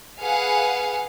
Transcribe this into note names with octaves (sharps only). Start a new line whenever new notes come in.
G#4 B4 F5 F#5 G#5